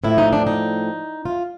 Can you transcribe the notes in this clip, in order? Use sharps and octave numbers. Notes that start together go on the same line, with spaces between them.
A2 F3 E4
D#4
D4
D#4
F4